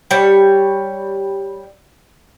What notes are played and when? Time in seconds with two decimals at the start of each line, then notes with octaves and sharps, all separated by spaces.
0.11 G3 C#5